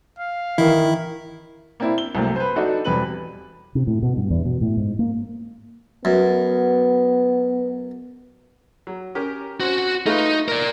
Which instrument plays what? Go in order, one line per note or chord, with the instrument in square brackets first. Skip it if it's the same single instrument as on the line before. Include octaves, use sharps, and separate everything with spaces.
[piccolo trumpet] F5
[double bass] D#3 [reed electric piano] E3 [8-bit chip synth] E4
[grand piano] A#3 C4 D4 E4
G7
C2 F#2 C3 A3 A#3
B4 C5
D4 D#4 F#4 A4
E1 E2 G3 C4 B4 F#7
[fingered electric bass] C3
A2
B2
G2
E2
B2
A2
G#2
A#3
[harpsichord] F#2 [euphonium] B3
[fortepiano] F#3
C#4 G4 A#4
[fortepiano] C4 C#4 [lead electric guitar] F#4
[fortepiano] A3 F4 B4 [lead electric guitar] D#4
[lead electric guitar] A#4 D5